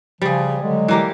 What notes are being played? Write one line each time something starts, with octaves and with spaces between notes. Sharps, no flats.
C#3 F3 G3 G#4
D3 F#3 G#3
E3 A#3 G4